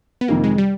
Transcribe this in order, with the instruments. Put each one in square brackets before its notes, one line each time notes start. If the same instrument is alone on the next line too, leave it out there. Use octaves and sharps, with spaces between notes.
[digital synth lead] B3
[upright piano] F2 C3 D#3 [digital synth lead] A#3
[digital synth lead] G#3
G3